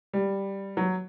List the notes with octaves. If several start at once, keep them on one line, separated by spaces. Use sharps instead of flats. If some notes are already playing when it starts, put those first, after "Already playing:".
G3
F#3